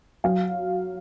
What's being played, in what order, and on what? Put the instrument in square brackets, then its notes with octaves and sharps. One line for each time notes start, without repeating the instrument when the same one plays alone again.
[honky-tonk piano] F#3 F5